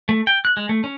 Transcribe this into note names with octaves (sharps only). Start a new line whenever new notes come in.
A3
G5
F#6
G#3
A3
C#4